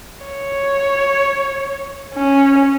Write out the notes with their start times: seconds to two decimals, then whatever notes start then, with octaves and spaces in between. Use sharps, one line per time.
0.25 C#5
2.14 C#4